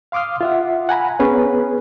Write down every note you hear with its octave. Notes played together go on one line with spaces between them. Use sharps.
F5 C6 D6 D#6 F6
F4 E5 F#5
F#5 G#5 A#5 B5
B3 C#4 G#4 B4